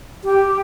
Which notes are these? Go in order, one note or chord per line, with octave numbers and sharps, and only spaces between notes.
G4